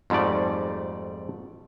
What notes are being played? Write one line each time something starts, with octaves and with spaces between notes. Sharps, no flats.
F2 G#2 G3 A3 D5